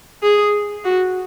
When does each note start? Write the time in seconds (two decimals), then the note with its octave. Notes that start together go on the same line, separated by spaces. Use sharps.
0.23 G#4
0.85 F#4